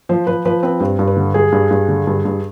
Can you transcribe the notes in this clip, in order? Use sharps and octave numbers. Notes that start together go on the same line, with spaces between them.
F3 C5
F3 B4
F3 B4
C4 B4
G2
G2
B4
D3
G2 G#4
G2
G2
D3
G2
G2